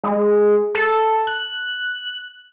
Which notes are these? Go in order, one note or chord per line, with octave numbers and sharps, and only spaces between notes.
G#3
A4
F#6